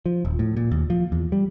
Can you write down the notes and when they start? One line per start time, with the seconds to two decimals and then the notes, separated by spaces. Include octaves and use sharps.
0.06 F3
0.25 D#1
0.39 A2
0.56 A#2
0.71 D#2
0.90 F3
1.12 E2
1.32 G3